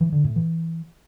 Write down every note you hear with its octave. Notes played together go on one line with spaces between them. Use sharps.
E3
D3
A2
E3